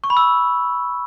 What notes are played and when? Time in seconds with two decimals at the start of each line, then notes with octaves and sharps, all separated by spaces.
0.04 C#6
0.10 B5
0.17 E6